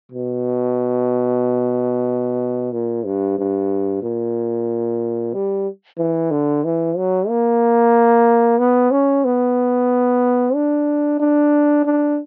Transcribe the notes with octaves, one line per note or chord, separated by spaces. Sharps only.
B2
A#2
G2
G2
A#2
G3
E3
D3
E3
F#3
A#3
B3
C#4
B3
D4
D4
D4